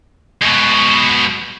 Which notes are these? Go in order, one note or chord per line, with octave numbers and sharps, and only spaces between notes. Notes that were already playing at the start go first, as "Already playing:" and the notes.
G#2 B2